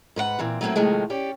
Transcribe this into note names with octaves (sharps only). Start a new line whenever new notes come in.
G#2 B4 C5 F#5
A#2 E3 C4
F#3 G3 A3 A#3 C4 E4
C3 D#3 F3 G#3 A3
C#4 G4 D5